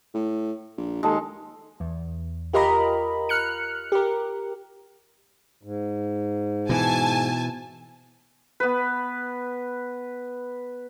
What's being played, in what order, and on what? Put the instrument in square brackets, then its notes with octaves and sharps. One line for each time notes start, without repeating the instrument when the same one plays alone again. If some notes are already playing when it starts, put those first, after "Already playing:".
[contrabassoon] A2
A#1
[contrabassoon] D#2 [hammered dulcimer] G#3 A4 A5
[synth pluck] E2
F4 G4 A#4 D#5 A#5 B5
F6 F#6 C#7
G4 A#4
[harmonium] G#2
[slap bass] B2 E3 [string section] G#5 A5
[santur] B3 B4